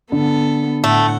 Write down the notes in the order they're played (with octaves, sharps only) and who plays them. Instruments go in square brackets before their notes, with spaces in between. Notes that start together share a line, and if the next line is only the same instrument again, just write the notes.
[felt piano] D3 [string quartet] B3 A4
[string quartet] A2 F#5 [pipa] A3